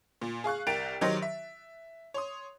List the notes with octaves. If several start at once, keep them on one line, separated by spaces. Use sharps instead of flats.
A#2
G#4 F5 C#6 F#6
C2 A#4 G5 A6 D7 F7
D#3 F#3 D#4 G4 C5
E5
C#5 C6 D#6